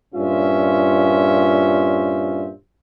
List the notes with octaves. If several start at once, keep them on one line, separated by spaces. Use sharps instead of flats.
G2 A#2 C#4 F4 C5 E5